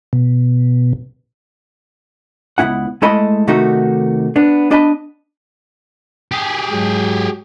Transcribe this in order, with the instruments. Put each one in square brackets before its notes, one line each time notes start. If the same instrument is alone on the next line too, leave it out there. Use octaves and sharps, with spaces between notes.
[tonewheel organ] B2
[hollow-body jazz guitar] C#2 E3 B3 E4 F#5
G#3 A3 E4 A4 D#5 B5
C3 D#3 A3 D#4 F#4 G4
B3 D4
B3 D4 D5 D#5 A5 B5
[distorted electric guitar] G4 G#4
[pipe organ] G#2 F#3 G#3